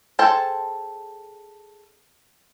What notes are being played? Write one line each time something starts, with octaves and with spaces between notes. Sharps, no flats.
G#4 A4 C5 G5 A5